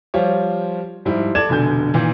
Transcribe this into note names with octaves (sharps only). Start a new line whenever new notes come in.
F3 G3 F4 C5 C#5
G#2 F3 G3 E4
A4 D5 G#6 E7
F1 B2 D3 G#5 G6
A#2 D#3 E3